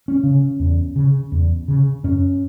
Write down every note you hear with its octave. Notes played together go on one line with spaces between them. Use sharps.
C#4
C#3
E2
C#3
E2
C#3
F#2 C#4